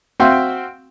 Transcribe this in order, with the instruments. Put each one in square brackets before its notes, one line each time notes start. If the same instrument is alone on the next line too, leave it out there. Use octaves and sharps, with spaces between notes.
[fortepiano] C4 F#4 E5 F5 G5 C6